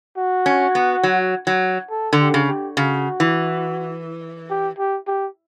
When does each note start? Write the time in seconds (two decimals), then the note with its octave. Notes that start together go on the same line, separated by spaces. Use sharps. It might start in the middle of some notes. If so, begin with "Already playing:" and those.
0.17 F#4
0.46 C#4
0.75 B3
1.03 F#3
1.47 F#3
1.90 A4
2.13 D3
2.19 G4
2.34 C#3
2.48 G4
2.77 C#3 F#4
3.20 E3
4.50 G4
4.78 G4
5.07 G4